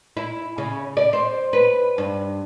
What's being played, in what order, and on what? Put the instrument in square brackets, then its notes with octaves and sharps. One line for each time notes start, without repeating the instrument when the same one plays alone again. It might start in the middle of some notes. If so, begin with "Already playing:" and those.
[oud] E4
C#3
D5
C5
B4
G2